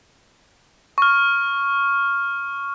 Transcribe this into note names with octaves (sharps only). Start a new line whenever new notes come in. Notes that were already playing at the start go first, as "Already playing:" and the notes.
C#6 F6